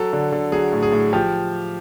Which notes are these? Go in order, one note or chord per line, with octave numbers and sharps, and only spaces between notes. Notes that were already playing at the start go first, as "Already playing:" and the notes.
Already playing: F#3 A4
D3
D3
F#3 G#4
A2
G#4
A2
F3 G4